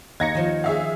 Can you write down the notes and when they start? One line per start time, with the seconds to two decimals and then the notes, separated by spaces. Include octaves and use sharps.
0.20 D#2 D#4 G#6 A#6 C#7
0.35 D#3 F3
0.64 G#4 E5 F5